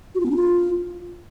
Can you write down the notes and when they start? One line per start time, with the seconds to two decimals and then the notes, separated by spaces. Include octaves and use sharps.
0.15 F#4
0.20 F4
0.25 B3
0.31 D4
0.36 F4